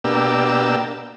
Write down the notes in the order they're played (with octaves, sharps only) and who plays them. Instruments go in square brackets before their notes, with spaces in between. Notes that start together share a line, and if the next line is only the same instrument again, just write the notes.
[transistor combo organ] B2 A#3 D4 G4 E6